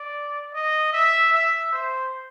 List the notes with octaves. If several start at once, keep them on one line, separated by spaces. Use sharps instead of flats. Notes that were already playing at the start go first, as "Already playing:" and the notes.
Already playing: D5
D#5
E5
E5
C5